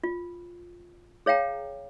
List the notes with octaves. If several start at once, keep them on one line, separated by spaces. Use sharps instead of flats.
F4
G#4 C#5 F5 G5 A#5